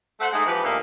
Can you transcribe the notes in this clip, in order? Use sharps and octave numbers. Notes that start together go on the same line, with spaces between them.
A3 C5 F#5
G#3 A3 D#4
E3 F3 G4 B4
D2 A#2 A#3 G4 D#5 E5